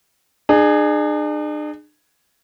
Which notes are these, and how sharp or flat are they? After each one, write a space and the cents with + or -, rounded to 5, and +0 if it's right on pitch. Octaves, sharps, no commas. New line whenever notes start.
D4 +45 G#4 +0